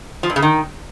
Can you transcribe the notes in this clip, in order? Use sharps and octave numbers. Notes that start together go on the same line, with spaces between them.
F3
G2
C#3
D#3